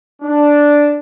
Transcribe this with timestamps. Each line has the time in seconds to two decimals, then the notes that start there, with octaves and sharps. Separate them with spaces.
0.22 D4